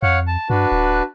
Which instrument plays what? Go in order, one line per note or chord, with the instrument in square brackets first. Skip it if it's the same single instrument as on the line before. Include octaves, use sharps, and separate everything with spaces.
[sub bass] F2 [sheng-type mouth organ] C#5 F5 F#5
[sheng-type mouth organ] A5
[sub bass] G2 [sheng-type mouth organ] D4 F#4 B4
[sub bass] D1